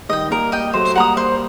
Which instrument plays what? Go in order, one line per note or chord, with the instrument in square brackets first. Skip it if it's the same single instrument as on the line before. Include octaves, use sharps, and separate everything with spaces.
[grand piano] D#3 G3 [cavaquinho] D#5 G5
[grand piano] G3 A#3 [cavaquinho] A#4
[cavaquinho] D#5 G5
[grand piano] F#3 A3 [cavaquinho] C5
[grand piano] G3 A#3 [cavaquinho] F#5 A#5 D#6
[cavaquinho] C5